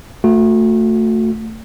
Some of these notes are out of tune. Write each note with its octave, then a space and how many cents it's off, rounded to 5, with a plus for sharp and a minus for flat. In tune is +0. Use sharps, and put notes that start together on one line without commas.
A3 +15 F#4 -35